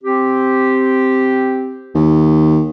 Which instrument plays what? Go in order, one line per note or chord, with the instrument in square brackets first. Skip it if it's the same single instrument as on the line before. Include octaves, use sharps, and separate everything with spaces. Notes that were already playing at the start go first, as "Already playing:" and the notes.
[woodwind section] C4 G4
[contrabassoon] D#2